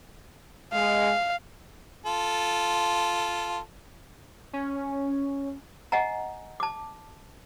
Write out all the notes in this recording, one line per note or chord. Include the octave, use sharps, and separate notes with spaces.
G#3 F5
F4 A4
C#4
D#5 F#5 G#5 A#5
A5 D6